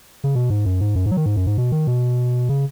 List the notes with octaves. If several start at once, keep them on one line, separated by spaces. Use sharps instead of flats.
C#3
B2
G#2
F#2
G#2
F#2
G#2
F#3
D#3
G#2
F#2
G#2
B2
D#3
B2
C#3